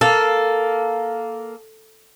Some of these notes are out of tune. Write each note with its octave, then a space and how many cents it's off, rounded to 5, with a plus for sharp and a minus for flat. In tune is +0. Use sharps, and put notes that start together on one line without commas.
A#3 +0 A4 +0